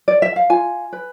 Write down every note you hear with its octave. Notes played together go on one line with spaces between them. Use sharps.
D5
E5
F5
F4 G#5
B4